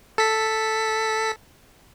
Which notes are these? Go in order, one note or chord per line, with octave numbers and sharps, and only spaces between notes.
A4 B6